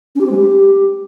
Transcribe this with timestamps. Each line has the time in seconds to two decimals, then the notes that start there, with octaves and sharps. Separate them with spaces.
0.15 C#4
0.21 G4
0.26 C4
0.31 G#3
0.37 G4